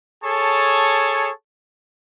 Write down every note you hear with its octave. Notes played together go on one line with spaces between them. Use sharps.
G#4 A4 C#5 A5 C#6